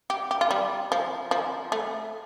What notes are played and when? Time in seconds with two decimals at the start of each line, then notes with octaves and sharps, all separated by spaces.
0.10 G4
0.31 G4
0.41 F4
0.51 G3
0.92 F3
1.31 F3
1.72 A3